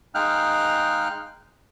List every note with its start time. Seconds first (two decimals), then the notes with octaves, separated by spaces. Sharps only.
0.15 G#3 D#4 F5 G5 F6 F#6